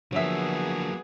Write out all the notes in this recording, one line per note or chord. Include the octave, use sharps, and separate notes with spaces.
D3 F3 F#3 A#3 B3 G#4 C#5 E5